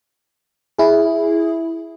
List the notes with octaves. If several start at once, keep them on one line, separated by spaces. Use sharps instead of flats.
E4 G#4